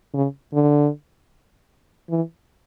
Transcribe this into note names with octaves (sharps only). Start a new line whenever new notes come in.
C#3
D3
E3